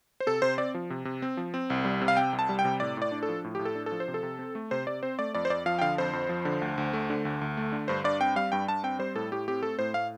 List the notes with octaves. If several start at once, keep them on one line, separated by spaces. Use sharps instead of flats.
C5
C3 A4
C3 C5
C4 D5
F3
C3
C3
C4
F3
C4
C2
G3
C3
F5
C4 G5
C2
A5
G3
G5
C3
A2 D5
A2 D5
D4
A4
F3
A2
A2 G4
A4
D4
A4
F3
C5
C3
A4
C3
C4
A3
C3 C5
C3 D5
C4 C5
A3 D5
F2 D5
C5
F2 D5
F3 F5
G5
D3 F5
F2 C5
F2
F3
D3
D2
D2
A3
D3
D2
D2
A3
D3
G2 C5
G2 D5
C4 G5
G3 F5
G2 G5
G2 A5
C4 G5
G3 C5
A2 A4
A2 G4
C4 G4
A3 A4
A2 C5
A2 F5